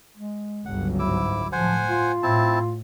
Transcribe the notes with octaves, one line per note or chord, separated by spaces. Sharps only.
G#3
G1 C#2 F#3 F#5
G#2 E4 D6 E6
A2 F3 C5 F#5 G#5
F4
A2 C4 E4 A5